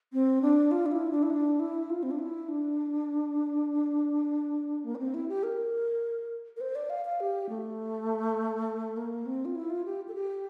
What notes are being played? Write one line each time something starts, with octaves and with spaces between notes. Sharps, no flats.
C4
D4
F4
D4
E4
D4
E4
D4
E4
F4
C4
D4
E4
D4
A#3
D4
C4
E4
G4
A#4
A#4
C5
D5
F5
F5
G4
A3
A#3
C4
F4
E4
F4
G4
A4
G4